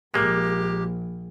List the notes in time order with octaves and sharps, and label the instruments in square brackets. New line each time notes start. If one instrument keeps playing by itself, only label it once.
[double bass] A#1 [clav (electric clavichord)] G#3 A#3 [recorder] G4